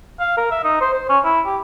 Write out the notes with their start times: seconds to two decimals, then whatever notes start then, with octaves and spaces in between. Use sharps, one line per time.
0.20 F5
0.37 A#4
0.51 E5
0.64 D#4
0.81 C5
0.93 C5
1.10 C#4
1.25 E4
1.46 G4